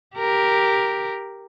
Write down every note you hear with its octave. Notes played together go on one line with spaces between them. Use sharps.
G4 A#4